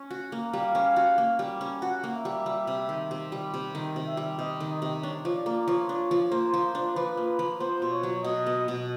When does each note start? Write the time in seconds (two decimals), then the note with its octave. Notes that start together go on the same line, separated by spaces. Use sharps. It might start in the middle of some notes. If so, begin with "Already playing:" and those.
Already playing: C#4
0.11 F#4
0.32 A#3
0.53 G3 F5
0.75 C#4
0.96 F#4
1.18 A#3
1.39 G3
1.61 C#4
1.82 F#4 F#5
2.04 A#3
2.14 E5
2.25 G3
2.46 G3
2.67 C3
2.89 D#3
3.11 C3
3.32 G3
3.54 C3
3.75 D#3
3.96 C3
4.07 E5
4.17 G3
4.39 C3 D#5
4.60 D#3
4.71 D#5
4.82 C3
5.03 D4 C#5
5.25 F3
5.35 D5
5.46 A#3
5.67 F3 C#5
5.89 D4
6.11 F3
6.32 A#3 C5
6.54 F3
6.75 D4
6.96 F3 B4
7.17 A#3
7.39 F3
7.60 B3 C5
7.82 B2
7.93 C#5
8.03 F#3
8.24 B2 D#5
8.46 B3
8.68 B2